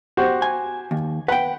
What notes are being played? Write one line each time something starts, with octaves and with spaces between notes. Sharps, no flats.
F#4 G4 C5
G#5
D#2
B4 F#5 G5